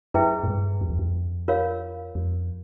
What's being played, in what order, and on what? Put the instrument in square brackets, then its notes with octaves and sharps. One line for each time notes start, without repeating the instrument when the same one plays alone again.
[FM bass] F#2 [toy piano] E4 G#4 B4 E5 G5
[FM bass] G#2
G2
F2
E2
F2
[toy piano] F4 A#4 C#5 F5
[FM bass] F2